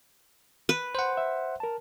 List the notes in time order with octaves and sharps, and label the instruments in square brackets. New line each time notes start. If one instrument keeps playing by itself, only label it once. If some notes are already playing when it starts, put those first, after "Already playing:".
[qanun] B4
[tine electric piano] C5 F#5 [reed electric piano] C6
[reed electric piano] E5
A#4 A5